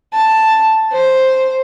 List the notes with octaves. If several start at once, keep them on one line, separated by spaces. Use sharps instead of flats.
A5
C5